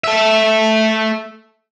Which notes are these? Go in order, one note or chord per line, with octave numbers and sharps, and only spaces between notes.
A3 E5